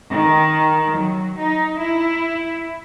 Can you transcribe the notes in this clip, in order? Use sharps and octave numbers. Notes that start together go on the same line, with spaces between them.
D#3
F#3
D#4
E4